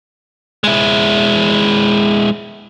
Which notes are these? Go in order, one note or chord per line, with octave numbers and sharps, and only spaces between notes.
G#3 E4